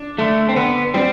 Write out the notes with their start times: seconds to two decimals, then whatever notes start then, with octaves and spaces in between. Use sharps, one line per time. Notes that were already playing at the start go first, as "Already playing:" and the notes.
Already playing: D4
0.18 D3 A3
0.49 C4
0.56 D3 B3
0.94 G3 C4